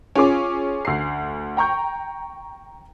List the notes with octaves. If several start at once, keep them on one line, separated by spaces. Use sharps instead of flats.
C#4 F4 G#4 D6
D2 C7
G5 A#5 C#6 G6